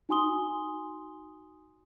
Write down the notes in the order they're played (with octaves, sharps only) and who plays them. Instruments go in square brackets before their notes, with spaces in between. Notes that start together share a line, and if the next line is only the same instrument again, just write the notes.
[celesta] D#4 F#4 G#5 C6 D#6 G7